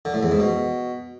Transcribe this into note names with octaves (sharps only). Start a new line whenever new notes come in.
D3
A2
E2
G#2
B2